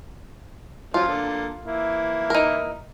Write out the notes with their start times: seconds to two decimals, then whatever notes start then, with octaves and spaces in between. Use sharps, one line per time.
0.94 F3 F#3 C#4 F4
1.08 D3 A#3 A4
1.65 E3 A#3 E4
2.30 D#4 A#4